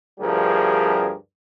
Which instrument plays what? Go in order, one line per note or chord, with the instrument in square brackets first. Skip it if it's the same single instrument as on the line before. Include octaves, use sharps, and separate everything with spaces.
[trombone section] D2 G2 F3 G3 G#4 A#4